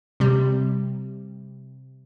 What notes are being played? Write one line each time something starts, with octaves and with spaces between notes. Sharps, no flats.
C3 G3